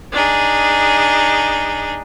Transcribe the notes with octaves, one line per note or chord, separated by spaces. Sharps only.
D4 D#4 G#4